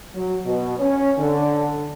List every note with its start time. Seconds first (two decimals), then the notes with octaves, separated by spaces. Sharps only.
0.15 F#3
0.45 B2
0.79 C#4
1.19 D3